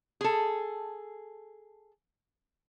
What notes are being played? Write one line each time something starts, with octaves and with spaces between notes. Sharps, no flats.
G#4 A4